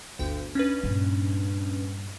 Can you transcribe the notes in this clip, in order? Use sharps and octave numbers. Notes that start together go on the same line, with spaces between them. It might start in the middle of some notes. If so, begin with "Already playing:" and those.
G1 D2 G5
C#4 D4 B4
G2 A#2